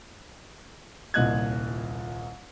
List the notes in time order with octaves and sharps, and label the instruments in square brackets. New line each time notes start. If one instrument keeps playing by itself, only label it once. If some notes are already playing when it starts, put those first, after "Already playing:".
[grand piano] D#1 C2 A#2 D#5 F#6 G#6